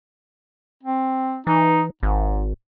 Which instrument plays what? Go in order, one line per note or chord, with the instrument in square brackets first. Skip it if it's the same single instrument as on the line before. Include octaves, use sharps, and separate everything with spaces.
[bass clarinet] C4
[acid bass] E3 [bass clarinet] D#4
[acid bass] G#1 [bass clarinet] G#2